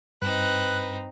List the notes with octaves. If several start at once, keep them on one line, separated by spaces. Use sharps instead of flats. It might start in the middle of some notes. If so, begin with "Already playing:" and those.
G2 C4 D#4 B4 F#6